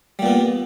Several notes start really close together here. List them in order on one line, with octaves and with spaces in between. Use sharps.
G3 A#2 B3